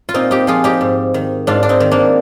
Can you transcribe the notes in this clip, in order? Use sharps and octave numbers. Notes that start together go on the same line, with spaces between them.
F4
A#2 C4 D#4
D#4 G4
F3 F4 G#4
D#4 G4
G#2
D#3
G#2 D4 F4
D4
C4 D#4
D#3
A#3 D4